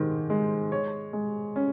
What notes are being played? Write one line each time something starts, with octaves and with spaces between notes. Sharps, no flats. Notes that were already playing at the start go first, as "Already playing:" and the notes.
Already playing: G#2 D#3 G#3
G#3
C#5
G#3
C#4